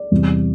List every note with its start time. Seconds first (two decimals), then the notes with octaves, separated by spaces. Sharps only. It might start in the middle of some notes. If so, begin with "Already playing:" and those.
Already playing: D5
0.11 E2 C3 G3